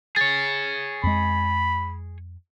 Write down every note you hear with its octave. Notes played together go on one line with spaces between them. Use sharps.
G#4 C#5 A6
F2 G#3 B5